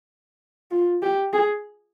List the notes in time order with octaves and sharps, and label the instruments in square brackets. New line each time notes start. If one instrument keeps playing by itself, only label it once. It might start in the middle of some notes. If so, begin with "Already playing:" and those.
[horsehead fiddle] F4
G4
G#4